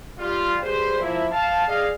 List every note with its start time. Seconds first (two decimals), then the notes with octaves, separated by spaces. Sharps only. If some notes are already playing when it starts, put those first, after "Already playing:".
0.18 G3 F4
0.61 G3 G#4 B4 C5
0.99 F3 A#3 E4
1.30 F5 A5
1.66 G#4 D5 D#5 F5